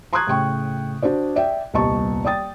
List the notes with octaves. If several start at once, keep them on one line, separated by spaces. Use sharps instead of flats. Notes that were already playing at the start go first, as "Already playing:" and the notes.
A#5 C6 C#6 D#6 F#6 G#6
A2 C#3 G5 C#6
D4 F#4 C5 D5
D5 E5 G5
D#1 C2 B3 D#5 A5 C#6
D5 G5 D#6 A6